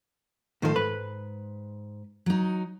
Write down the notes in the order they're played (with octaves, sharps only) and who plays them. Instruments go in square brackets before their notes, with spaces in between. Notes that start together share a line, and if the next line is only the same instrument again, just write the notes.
[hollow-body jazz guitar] A2 D#3 F3 [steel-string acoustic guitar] A4 C5
[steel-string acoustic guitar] G#2 [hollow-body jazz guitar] B4
[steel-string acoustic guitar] F#3 D#4